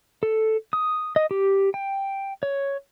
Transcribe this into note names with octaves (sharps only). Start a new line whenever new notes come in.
A4
D#6
D#5
G4
G5
C#5